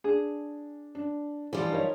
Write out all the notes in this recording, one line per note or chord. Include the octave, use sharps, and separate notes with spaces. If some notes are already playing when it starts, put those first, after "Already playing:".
D4 G#4
D4
E3 F3 G3
D#4 A#4 C#5